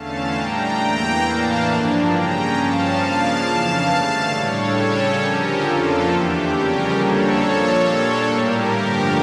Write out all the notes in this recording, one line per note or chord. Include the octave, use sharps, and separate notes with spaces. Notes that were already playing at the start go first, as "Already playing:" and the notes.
Already playing: E2 D3 A3 C#4 F5 A5
A2 G3 D4 G5 A#5
E2 E3 A#3
A2 E3 A#3 D4 F5 A5
G2 F3 A#3 D4
C#3 G3 C#4 G5 A#5
G2 F3 C#4 F5 A5
C#3 F3 A#3 D4
F2 C#3 E3 F5 A5
G2 D3 A3
A2 G3 D4 A4 C#5
C#3 G3 C#4
D3 F3 C#4 G4 A#4
F2 D3 F3 A#3 F4 A4
E2 E3 A3 D4 G4
F2 C#3 G3 C#4 G4 A#4
F2 D3 G3 A#3 D4 A4 C#5
A#2 F3 A#3
A#2 G3 D4 A4 C#5
A2 G3 A#3 G4 A#4
G2 D3 F3 A3